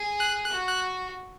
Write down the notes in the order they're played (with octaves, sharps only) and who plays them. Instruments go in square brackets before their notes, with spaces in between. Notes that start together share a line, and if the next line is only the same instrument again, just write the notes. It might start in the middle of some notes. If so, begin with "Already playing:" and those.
Already playing: [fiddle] G#4
[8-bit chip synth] F#6
F#6
[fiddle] F#4
[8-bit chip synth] F#6